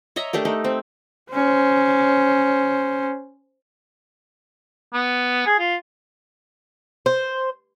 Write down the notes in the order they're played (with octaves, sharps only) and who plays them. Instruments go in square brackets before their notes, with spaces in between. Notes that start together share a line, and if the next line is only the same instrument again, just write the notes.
[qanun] C#5 D#5 E5 A#5
A3 D4 G4 A#4
A3 D#4
C4
[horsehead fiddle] C#4 C5
[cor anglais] B3
G#4
F4
[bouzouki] C5